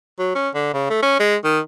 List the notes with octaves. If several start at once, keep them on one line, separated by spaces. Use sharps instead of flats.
F#3
C#4
D3
C#3
A3
C#4
G#3
D#3